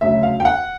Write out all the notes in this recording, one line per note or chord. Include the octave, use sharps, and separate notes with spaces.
D2 C#3 F#3 E5
F5
G5
F#5